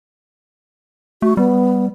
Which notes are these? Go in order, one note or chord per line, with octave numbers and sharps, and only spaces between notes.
A3 F#4
G3 B3